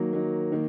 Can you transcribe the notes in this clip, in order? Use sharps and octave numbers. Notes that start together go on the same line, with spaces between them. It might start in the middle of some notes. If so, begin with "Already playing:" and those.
Already playing: D#3 F#3 A#3
D#3 F#3 A#3
D#3 A#3